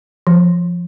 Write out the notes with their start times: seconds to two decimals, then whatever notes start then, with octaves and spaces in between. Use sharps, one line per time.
0.27 F3